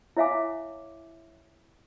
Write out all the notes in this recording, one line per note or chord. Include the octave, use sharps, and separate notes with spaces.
E4 C#5 E5 F5 G#5 D6